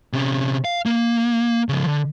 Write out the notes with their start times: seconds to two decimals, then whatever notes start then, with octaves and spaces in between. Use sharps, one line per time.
0.13 C3 C#4
0.65 F5
0.86 A#3
1.69 C#3 F3
1.85 D3